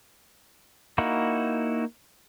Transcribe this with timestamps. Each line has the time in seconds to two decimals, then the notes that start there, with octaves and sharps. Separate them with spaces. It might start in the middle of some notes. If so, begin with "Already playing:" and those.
0.98 A#3 D#4 E4 F#4